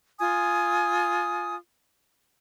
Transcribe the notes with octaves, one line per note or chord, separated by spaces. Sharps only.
F4 G#5 D#6